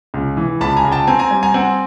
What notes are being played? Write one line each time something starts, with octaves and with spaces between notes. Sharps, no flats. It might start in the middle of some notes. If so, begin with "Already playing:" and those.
C#2
E3
C#2 A5 B5
G#5 A#5
C#2
G5 A5
C4 G#5 A#5
G#5 A#5
G3
G#5 A#5
C4 F#5 G#5